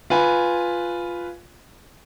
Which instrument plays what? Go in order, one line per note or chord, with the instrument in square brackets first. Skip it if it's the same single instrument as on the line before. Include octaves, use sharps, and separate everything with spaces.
[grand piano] F4 B4 G#5